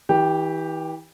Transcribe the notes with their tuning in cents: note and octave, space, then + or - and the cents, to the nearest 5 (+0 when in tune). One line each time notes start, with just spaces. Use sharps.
E3 -35 G4 +0